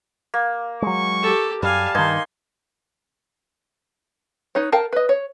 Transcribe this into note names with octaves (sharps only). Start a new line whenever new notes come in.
A#3
F#3 G#3 C#6
G4 A4
F#2 G3 F5 G#5 A5
G2 D#3 A#3 D#4 G#5 C6
D#4 B4 C#5
A#4 F5 G5 A5
B4 D#5
C#5